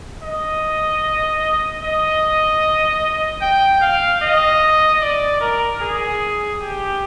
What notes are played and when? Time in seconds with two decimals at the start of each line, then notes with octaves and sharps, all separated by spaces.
0.23 D#5
1.82 D#5
3.41 G5
3.81 F5
4.21 D#5
5.01 D5
5.41 A#4
5.81 G#4
6.61 G4